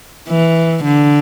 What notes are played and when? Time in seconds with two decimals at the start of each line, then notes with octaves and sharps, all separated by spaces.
0.28 E3
0.84 D3